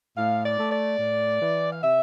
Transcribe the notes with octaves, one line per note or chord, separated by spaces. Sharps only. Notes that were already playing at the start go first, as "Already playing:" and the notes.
A2 F5
D5
A3
D5
A2
E3
F5
C3 E5